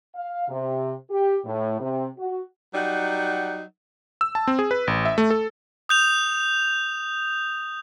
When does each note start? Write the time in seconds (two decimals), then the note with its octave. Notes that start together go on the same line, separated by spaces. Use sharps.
0.15 F5
0.49 C3
1.10 G4
1.45 A2
1.80 C3
2.18 F#4
2.74 F#3 G3 D#4 F#5
4.21 E6
4.35 A5
4.47 C4
4.59 G#4
4.71 B4
4.87 A1
5.05 E5
5.18 A3
5.30 A4
5.89 D#6 G6 F7